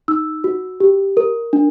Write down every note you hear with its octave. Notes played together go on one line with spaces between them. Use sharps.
D#4 E6
F#4
G4
A#4
D4